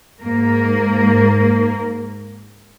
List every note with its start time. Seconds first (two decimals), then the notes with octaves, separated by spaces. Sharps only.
0.20 G#2 A#3 A#4